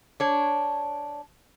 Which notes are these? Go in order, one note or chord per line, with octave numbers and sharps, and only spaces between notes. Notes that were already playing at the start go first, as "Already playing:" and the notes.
D4 C#5